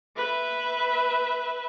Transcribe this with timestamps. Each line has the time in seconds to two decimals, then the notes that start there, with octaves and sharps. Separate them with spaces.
0.16 B4 E5